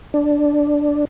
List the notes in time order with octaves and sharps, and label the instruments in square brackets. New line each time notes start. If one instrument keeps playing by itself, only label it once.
[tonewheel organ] D4